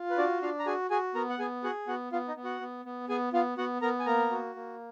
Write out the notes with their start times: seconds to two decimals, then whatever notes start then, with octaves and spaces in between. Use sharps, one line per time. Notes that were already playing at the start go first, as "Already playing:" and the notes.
Already playing: F4
0.10 B4
0.17 D4 F#4 D5
0.42 D4 F4 F5
0.59 A#5
0.66 F#4 G#4 G#5
0.90 F#4 G#4 G#5
1.15 B3 A#4 A#5
1.29 F#5
1.39 B3 G#4 G#5
1.63 F#4 G#4 F#5
1.88 B3 F#4 F#5
2.12 B3 F4 F5
2.28 D#4 D#5
2.36 B3
2.44 F#4 F#5
2.61 B3
2.85 B3
3.09 B3 G#4 G#5
3.33 B3 F4 F5
3.58 B3 F#4 F#5
3.82 B3 A#4 A#5
3.99 G#5
4.06 A#3 A#4 A#5
4.31 F#4
4.55 A#3